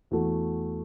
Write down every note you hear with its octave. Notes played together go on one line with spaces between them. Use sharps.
E2 E3 A3 F#4